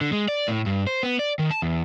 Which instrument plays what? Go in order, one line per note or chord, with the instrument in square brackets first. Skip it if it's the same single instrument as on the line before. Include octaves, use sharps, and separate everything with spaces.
[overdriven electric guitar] D3
G#3
D5
A2
G2
C5
B3
D5
D#3
A5
E2